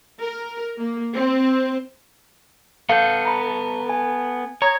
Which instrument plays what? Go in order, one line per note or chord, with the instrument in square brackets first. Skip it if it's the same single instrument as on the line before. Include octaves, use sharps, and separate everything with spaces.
[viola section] A#4
A#3
C4
[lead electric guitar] B3 A4 [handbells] F5 G6
[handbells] A#5 B5
G#5
[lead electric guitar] C#5 [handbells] A#5 D#6 G#6